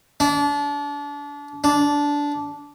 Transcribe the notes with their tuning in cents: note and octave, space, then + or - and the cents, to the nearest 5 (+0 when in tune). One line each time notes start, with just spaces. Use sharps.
D4 -30
D4 -15